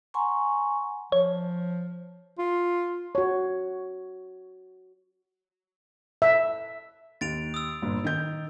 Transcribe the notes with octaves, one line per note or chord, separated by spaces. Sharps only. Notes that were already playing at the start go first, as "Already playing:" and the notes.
F#5 G#5 A#5 C6 C#6
F3 C#5
F4
F#4 C#5
E5
D#2 A6 D7 F7
D#6 E6
G1 A#2
D#3 G6